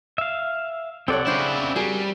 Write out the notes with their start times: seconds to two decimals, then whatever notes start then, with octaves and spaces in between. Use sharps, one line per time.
0.18 E5 F5
1.08 C2 C4 A4 C#5 D5 F#5
1.27 C#3 C#4 D4 E4 C5
1.76 G3 F#4 G#4 A#4